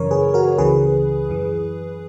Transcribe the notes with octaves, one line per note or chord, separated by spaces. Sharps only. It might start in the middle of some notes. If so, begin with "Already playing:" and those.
Already playing: F#2 C#3 E3 A#4 C#5
G#4 B4
F#4 A#4
C#2 C#3 E3 G#4 B4
F#2 E3